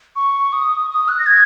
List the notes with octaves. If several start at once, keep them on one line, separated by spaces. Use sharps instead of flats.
C#6
D#6
D#6
F#6
A#6
G#6